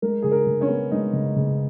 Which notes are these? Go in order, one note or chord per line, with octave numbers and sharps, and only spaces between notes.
G#3 A#4
C#3 G#4
A#4
C#3
C#4 C#5
B3
G#3 D#4 D#5
C#3
C#3